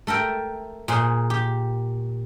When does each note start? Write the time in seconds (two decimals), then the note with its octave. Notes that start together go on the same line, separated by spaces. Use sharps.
0.07 A3 A4 A#4 G5
0.88 A#2 G#4 C5 C6
1.30 G4